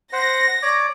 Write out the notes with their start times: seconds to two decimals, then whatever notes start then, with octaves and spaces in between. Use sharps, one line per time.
0.13 C5 F#5 A#6
0.63 C#5 D5 D6